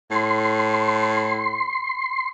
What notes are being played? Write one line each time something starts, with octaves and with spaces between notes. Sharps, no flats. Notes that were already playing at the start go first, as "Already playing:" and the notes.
A2 C6